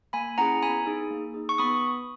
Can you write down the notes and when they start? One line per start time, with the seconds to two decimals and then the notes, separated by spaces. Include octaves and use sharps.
0.13 A#3 G#5 B5
0.38 C#4 E4 G#4 F#5 A#5
0.62 B3 G#5 B5
0.86 D#4 G#4
1.11 A#3
1.34 D#4 G#4
1.49 C#6
1.58 B3 B5 D#6